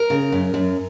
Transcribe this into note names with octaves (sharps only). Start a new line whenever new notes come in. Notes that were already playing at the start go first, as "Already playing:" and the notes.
Already playing: A#4
C#3
F#2
F#2